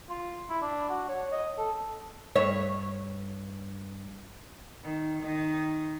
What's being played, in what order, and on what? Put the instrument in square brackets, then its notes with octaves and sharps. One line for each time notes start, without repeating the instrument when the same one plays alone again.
[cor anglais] F4
E4
D4
F#4
C#5
D#5
A4
[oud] G2 C#5 E5
[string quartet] D#3
D#3 D#5